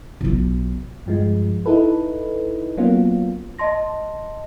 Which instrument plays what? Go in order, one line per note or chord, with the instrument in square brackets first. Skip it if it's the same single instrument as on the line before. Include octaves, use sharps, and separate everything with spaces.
[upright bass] B1 F4
[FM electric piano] G2 F3 G#3
D#4 E4 A4 B4
F#3 A#3 B3 C#4 F4
[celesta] D#5 A5 C6 A#6